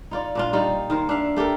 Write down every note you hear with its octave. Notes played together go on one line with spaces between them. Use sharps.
D#4 F4 D5
A#2 D4 F4
G3 D#4 F4
D#3 A#4 C5
D4 E5 F5
A3 G4 A4 A#4